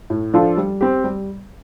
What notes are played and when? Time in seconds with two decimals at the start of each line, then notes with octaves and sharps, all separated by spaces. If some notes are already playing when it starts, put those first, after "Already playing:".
0.10 A2
0.34 F3 D4 F4 A4
0.57 G3
0.81 C4 G4
1.04 G3